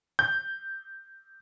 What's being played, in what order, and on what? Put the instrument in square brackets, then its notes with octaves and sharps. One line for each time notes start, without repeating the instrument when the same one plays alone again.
[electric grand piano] G6